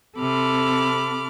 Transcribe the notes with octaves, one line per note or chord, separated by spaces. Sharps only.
C3 C4 A4 B5 D6 F6